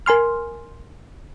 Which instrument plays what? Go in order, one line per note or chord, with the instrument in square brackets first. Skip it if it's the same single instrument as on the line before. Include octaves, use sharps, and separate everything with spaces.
[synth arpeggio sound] A#4 G#5 C6 F6